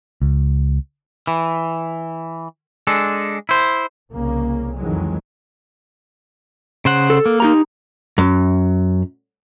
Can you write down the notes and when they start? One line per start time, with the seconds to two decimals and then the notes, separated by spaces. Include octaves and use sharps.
0.22 C#2
1.27 E3
2.87 G#3 D4 A4
3.49 E4 C5
4.12 C2 C#3 A#3
4.77 F2 D#3 E3 F#3 G#3
6.85 C#3 C5 F#5
7.10 A4
7.26 A#3
7.40 D#4 G4 A#5
8.18 F#2